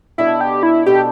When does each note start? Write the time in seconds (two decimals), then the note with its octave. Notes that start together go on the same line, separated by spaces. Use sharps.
0.18 B2 B3 D4 E4 A4
0.41 G4
0.63 E4
0.86 B2 B3 D4 G4 A4